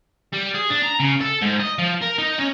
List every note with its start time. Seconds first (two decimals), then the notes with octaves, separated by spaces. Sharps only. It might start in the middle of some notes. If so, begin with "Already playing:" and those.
0.33 G3
0.55 G#4
0.70 D4
0.83 A#5
1.00 C#3
1.21 A4
1.42 G#2
1.59 D#5
1.78 F3
2.01 A#4
2.18 D#4
2.39 C#4